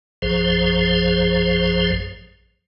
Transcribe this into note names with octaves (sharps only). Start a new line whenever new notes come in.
A#1 F#2 F3 G#4 C5